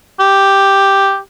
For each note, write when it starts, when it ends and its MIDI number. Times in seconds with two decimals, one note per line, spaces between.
0.20 1.18 67